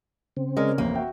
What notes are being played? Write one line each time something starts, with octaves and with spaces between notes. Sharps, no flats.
C#3 C4
G#3 C#4 A#4 D5
A1 F2 C3 A#3
F#4 E5 G5